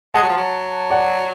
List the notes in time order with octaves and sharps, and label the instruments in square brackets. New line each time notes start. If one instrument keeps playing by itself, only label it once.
[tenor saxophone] G#3 [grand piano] F#5 A5
[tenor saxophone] F#3
F3
F#3
[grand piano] D5 F#5